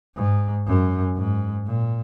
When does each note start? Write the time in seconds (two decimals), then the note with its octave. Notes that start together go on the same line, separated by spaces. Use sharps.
0.16 G#2
0.67 F#2
1.17 G#2
1.67 A#2